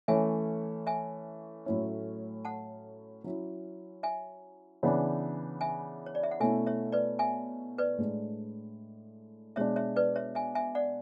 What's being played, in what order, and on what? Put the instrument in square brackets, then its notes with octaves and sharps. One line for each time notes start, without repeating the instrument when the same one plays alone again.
[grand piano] E3 A3 C#4 [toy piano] E5 G#5
[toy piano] E5 G#5
[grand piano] A2 F#3 A3 C#4 E4
[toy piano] F#5 A5
[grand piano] F#3 C#4 E4
[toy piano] E5 G#5
[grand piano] C#3 E3 B3 D4
[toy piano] E5 G#5
C#5
D5
E5
F#5
[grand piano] B2 A3 C#4 E4 [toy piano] E5 G#5
[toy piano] C#5 E5
B4 D5
E5 G#5
B4 D5
[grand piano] A2 G#3 D4
[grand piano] B2 G#3 D4 [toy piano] C#5 E5
[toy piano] C#5 E5
B4 D5
C#5 E5
E5 G#5
E5 G#5
D5 F#5